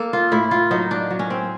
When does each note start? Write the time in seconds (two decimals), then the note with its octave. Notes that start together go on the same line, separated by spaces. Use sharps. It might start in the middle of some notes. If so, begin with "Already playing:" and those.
Already playing: A#3 A4
0.13 F4
0.32 A2 E4
0.51 F4
0.71 F#3 D#4
0.91 D4
1.10 F#3
1.19 C#4
1.30 C4